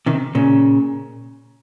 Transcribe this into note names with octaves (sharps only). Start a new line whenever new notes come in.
C3 D#3
A#2 C#3